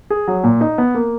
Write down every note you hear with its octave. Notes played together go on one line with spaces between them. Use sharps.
G#4
F#3
A#2
D#4
B3
A#3